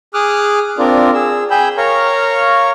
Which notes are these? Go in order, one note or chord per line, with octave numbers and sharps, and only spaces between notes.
G#4 D6 D#6 F6 F#6
C4 D4 F4 A#4 D5
G#4 E6
G#4 G5 G#5 B5 E6 G6
A#4 C#5 F5 A#5 C#6